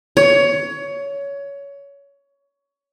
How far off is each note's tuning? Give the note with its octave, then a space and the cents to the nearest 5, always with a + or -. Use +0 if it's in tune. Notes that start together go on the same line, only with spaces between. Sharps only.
C#5 +20